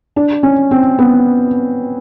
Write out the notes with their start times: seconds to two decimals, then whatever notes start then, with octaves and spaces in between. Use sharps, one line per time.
0.16 D4
0.43 C#4
0.71 C4
0.99 B3